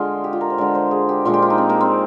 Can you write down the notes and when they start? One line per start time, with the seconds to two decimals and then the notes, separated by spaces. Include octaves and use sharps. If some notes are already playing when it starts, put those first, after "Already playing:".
Already playing: D3 G#3 F4 G#4
0.24 G4
0.33 F4
0.41 A#4
0.50 C5
0.58 D3 G#3 D5
0.75 C5
0.91 G#4
1.09 G4
1.25 A#2 F3 G#3 F4
1.34 G4
1.42 F4
1.50 D#4
1.58 C4
1.69 A#3
1.81 C4